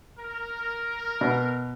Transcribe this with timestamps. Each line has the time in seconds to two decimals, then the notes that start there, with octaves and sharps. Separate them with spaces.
0.17 A#4
1.21 B2